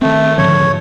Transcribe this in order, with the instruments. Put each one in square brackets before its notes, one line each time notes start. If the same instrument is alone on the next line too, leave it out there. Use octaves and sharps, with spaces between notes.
[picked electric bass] D#3 C4 [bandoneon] A3
[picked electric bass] G#2 D3 F3 [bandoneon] C#5